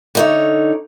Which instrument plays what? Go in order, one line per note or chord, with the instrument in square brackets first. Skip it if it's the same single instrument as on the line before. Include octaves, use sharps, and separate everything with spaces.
[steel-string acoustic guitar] D3 D#4 C#5